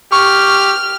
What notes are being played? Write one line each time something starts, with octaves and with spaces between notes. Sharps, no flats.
G4 C#6 F6